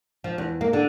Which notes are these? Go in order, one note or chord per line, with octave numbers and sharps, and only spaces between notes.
F3
E2
A#3
D3